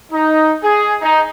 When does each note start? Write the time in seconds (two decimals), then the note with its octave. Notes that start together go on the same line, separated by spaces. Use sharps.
0.12 D#4
0.63 G#4
1.02 D#4